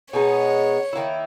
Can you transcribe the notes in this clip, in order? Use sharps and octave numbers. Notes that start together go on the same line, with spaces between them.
B2 G#3 B3 D#4 C#5
D#3 A#3 E4